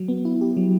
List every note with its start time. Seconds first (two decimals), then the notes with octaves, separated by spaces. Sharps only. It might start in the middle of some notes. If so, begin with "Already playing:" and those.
Already playing: F#3
0.08 B3
0.25 E4
0.41 G4
0.57 F#3